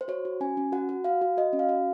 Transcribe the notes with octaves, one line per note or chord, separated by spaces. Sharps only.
C5
F#4 C#5
F#4
C#4 G#5
C#4
F#4 F#5
F#4
F#4 F5
F#4
F#4 D#5
C#4
F5
F#4